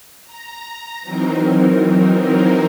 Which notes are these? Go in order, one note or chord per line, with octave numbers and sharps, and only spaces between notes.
A#5
E3 F#3 C4 D#4 A#4